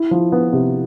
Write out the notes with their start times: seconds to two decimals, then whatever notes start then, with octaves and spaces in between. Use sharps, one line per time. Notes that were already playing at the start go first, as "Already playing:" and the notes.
Already playing: E4
0.11 F3
0.32 B3
0.53 C3